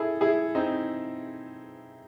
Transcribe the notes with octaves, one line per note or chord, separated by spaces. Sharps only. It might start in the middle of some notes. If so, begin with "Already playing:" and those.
Already playing: E4 G#4 A4
E4 G#4
C4 D#4